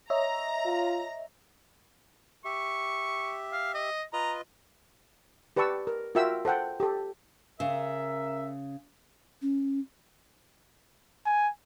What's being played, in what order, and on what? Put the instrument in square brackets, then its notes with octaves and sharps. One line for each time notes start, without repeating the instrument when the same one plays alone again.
[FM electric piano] C#5 D#5 E5 [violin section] A#5
[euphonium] F4
[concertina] G4 E5 [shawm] C#6
[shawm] F5
D#5
[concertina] F4 B4 D#5 [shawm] A#5
[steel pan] G4 B4 D5 A5 C#6 E6
A#4
F4 F#4 A#4 E5 G5 E6
A4 C5 F#5 G5
G4 A4
[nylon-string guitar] C#3 [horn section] A#4 E5
[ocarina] C#4
[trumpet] G#5